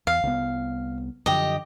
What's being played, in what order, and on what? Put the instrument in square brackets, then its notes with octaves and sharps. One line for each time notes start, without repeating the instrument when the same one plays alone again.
[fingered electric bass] E2 [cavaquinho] F5
[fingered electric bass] C2 B3
[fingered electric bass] F#2 D3 F3 [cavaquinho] G4 D#5